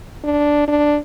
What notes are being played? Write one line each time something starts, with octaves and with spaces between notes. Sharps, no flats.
D4
D4